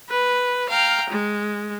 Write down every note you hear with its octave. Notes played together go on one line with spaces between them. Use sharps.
B4
F5 G5 A#5
G#3